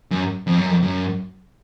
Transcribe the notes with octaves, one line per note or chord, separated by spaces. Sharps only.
F#2
F2
F#2
F2
F#2